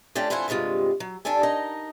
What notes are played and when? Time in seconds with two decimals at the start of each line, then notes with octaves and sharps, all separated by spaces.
0.15 A3 C#4 D4 F4 G4
0.30 F2 E4 F4 C5 F#5 G#5
0.48 D2 G2 C3 G#3 F4
1.00 F#3
1.25 G2 D4 G4 A4 G#5
1.43 D#4 A#4 D#5